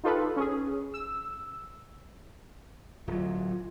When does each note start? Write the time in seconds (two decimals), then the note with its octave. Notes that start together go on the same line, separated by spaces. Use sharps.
0.04 D#4 F4 G4 A4 B4
0.36 C#4 G#4
0.94 E6
3.07 D1 F#3 F4